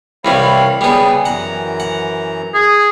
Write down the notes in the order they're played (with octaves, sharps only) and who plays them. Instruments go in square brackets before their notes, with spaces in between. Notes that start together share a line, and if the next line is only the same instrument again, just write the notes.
[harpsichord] C2 E3 G3 [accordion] C#5 F5 B5
[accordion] C#3 G#4 [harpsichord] G3 B3
[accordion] F#2 E3 A#5 [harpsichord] F#5
[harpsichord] F#5
[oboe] G#4